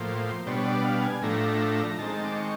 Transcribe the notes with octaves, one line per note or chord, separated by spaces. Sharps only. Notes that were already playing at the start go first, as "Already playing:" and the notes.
Already playing: A2 F3 A#3 C5
B2 G3 B3 D4 C#5
D5
F5
A5
G#5
A2 F3 A3 D4 A#5
D#3 G#3 C4 A5
D6
C#6